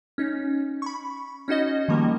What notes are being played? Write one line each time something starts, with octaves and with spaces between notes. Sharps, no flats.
C#4 D#4
B5 C#6
C#4 D#4 F#4 D#5
D#3 F3 G3 A#3